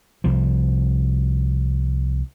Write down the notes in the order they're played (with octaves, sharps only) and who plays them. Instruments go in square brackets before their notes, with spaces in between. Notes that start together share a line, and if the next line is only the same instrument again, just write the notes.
[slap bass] C2 F3